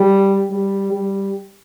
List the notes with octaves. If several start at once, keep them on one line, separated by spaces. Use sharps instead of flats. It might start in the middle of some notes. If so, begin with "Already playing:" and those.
Already playing: G3
G3
G3